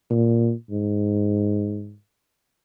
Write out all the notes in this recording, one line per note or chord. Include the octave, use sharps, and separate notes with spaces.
A#2
G#2